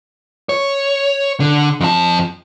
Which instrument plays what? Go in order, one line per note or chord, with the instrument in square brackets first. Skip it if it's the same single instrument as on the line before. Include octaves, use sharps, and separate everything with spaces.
[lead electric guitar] C#5
D3
F2 A5